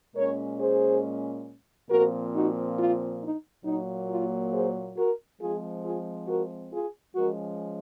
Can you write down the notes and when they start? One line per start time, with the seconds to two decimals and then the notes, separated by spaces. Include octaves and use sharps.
0.15 A#2 G#3 C#4 A#4 C#5
0.59 G#4 C5
1.90 A#2 F3 C4 F#4 A#4
2.34 D#4 F#4
2.78 F4
3.22 D#4
3.65 A#2 F#3 A#3 D#4
4.09 F4
4.52 G#4 C5
4.96 F#4 A#4
5.40 F3 G#3 C4 F4 G#4
5.83 F4 G#4
6.27 F#4 A#4
6.71 F4 G#4
7.15 F3 G#3 C#4 F#4 A#4